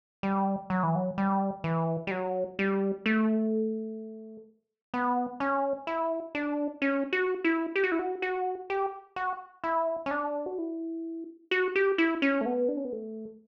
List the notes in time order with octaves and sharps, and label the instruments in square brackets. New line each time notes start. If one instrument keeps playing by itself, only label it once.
[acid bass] G3
F#3
E3
F#3
G3
E3
G3
F#3
G3
A3
B3
C#4
E4
D4
C#4
F#4
E4
G4
F#4
E4
F#4
F#4
G4
F#4
E4
C#4
D4
F#4
E4
F#4
G4
E4
C#4
A3
B3
D4
C#4
B3
A3